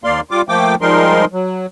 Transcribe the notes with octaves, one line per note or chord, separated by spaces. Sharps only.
D#2 A#3 D5 F5 C6
G3 F4 D6
F3 A3 A#3 G5 D6
F3 G3 G#3 D#4 A#4 C6
F#3